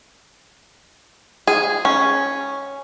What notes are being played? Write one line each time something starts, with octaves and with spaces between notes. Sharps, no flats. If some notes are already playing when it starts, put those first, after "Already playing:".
G#4
C#4